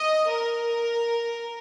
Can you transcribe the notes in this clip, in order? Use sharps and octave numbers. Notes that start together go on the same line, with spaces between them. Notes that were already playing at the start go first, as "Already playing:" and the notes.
Already playing: D#5
A#4